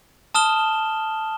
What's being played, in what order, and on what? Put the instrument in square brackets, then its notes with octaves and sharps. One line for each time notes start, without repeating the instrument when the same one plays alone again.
[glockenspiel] A5 D#6 F6 E7 G7